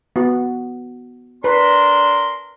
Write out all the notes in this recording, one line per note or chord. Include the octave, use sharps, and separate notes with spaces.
B3 F#4
D4 A#4 B4 C6